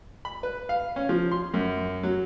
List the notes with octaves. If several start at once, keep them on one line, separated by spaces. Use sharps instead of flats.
B5
B4
F5
C#4
F3
C6
F#2
F#3